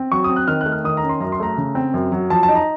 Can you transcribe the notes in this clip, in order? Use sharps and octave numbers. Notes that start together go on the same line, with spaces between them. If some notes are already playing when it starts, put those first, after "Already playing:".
Already playing: C4
F#3 C#6
C4 D#6
F#6
D#3 F6
F#6
A3
F6
D#3 D#6
A#5
C#4
C6
F#2 A#5
C6
A3 A#5
C#3
C4
F#2
F#3
F3 A5
A5
D#4
A#5